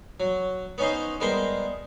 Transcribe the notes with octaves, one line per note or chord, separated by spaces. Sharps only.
F#3
B3 C#4 D#4 C5
G3 G#3 B3 A#4 C5